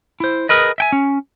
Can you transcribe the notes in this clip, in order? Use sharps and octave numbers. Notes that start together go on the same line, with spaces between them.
E4 C5
G#4 A#4 B4 D#5
E5 G5 G#5
C#4